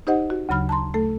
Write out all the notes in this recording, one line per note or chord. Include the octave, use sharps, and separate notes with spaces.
D#4 G4 C5 D#5 F#5
F#4
D2 C#3 F#3 B5 F6
A5 A#5 C6
A3 A4